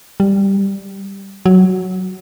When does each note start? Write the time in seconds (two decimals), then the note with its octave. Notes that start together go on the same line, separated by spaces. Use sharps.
0.20 G3
1.46 F#3